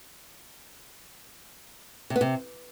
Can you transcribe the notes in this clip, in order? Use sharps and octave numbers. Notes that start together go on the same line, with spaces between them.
C3
B3
C3